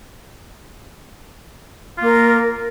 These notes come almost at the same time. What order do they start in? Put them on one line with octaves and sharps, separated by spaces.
F4 A#3 A#4